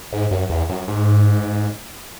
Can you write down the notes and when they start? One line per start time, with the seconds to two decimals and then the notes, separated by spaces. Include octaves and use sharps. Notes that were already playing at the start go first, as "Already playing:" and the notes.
0.13 G#2
0.31 F#2
0.50 E2
0.69 F#2
0.88 G#2